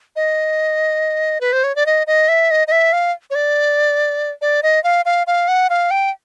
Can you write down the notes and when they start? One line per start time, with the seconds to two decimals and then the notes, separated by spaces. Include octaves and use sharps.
0.16 D#5
1.41 B4
1.53 C5
1.64 C#5
1.76 D5
1.86 D#5
2.07 D#5
2.28 E5
2.51 D#5
2.67 D#5
2.72 E5
2.93 F5
3.30 C#5
3.35 D5
4.42 D5
4.63 D#5
4.84 F5
5.05 F5
5.27 F5
5.48 F#5
5.70 F5
5.91 G5